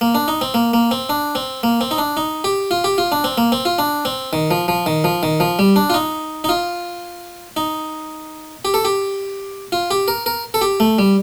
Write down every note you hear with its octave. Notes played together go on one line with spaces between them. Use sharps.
A#3
D4
D#4
C4
A#3
A#3
C4
D4
C4
A#3
C4
D#4
D4
D#4
G4
F4
G4
F4
D4
C4
A#3
C4
F4
D4
C4
D#3
F3
F3
D#3
F3
D#3
F3
G3
D4
F4
D#4
D#4
F4
D#4
G4
A4
G4
F4
G4
A#4
A#4
A4
G4
A3
G3